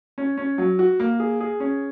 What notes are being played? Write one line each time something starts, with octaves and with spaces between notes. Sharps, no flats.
C#4
C#4
F#3
F#4
A#3
G#4
G#4
C#4